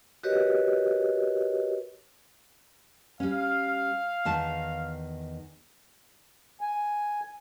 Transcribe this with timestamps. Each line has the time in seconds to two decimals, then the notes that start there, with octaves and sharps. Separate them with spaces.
0.23 F#4 G4 A#4 B4 C#5 D#5
3.20 G3 C#4 F5
4.25 E2 D#3 A5
6.61 G#5